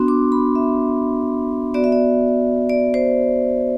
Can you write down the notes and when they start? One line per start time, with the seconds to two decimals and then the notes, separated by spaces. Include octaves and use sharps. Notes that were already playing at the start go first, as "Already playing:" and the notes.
Already playing: B3 D4 F#4 C6
0.08 D6
0.32 B5
0.55 E5
1.74 B3 F#4 D5
1.84 E5
1.92 D5
2.69 D5
2.94 C5